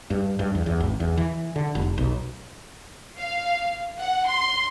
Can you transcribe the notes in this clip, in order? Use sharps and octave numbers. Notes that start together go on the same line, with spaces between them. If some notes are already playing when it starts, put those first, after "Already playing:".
G2
G2
E2
E2
G#1
E2
E3
D3
F1
B1
F5
F#5
C6